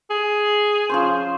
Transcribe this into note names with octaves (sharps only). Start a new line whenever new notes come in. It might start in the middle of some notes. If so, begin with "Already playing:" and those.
G#4
F3 C#4 C5